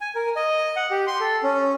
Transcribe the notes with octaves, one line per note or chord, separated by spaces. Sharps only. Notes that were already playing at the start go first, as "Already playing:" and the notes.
G#5
A#4
D#5
F#5
G4
C6
A4
C#4